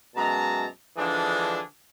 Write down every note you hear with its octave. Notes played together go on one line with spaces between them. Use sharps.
F#2 B2 G#3 A5 A#5
D3 E3 F3 G#3 D4 G#4